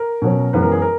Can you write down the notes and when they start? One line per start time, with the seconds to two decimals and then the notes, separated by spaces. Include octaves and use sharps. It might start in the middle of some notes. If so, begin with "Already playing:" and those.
Already playing: A#4
0.22 B2 F#3 C#4
0.53 F#2 E3 G#3 B3 B4
0.63 A#4
0.72 G#4
0.82 A#4